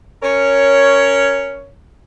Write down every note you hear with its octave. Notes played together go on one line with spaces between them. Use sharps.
C#4 A#4 C#5